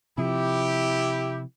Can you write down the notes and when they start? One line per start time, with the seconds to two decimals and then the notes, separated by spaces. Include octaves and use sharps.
0.18 C3 F3 E4 G4